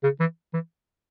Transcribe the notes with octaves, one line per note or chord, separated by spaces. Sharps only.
C#3
E3
E3